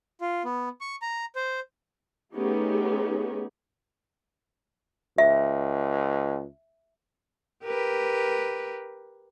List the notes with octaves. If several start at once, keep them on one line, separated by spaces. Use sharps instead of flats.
F4
B3
C#6
A#5
C5
A3 B3 C#4 D#4 G4 G#4
C#2 E5
G4 A#4 B4